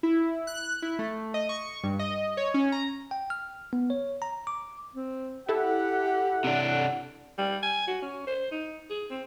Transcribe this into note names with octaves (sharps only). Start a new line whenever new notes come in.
E4
F#6
E4
A3
D#5
C#6
G2
D#5
C#5
C#4
A#5
G5
F6
B3
C#5
A#5
D6
C4
E4 G4 A4 F#5
C3 D4
G3
G#5
F#4
C#4
C5
D#4
G#4
C4